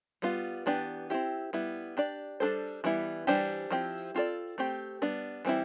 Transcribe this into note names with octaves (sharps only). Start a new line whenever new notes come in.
G3 B3 F4
E3 B3 D4 G4 D5
C4 E4 G4
G3 B3 E4
D4 G4 D5
G3 D4 A4 C5
E3 G3 B3 E4
E3 G3 D4 G4 C5
F3 C4 E4 G4
C4 F4 A4 D5
A3 C4 G4
G3 B3 D4
E3 G3 C4 E4